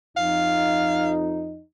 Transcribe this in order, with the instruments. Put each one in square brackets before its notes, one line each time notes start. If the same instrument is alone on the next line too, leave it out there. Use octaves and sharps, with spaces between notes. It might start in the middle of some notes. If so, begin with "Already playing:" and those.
[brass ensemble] F2 D#4 [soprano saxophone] F5